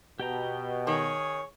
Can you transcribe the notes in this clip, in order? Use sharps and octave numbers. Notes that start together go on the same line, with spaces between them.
B2 G4 G5 A#5
D#3 G#4 C#5